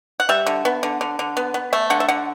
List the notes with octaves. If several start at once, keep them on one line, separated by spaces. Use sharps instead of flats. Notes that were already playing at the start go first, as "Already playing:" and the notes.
F#5
G3 E5
D3
B3
D3
D3
D3
B3
B3
A3 E5
D3 F#5
E5
D3 F#5